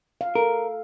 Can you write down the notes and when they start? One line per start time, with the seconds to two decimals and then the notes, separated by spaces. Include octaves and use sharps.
0.21 F5
0.35 A4 A#4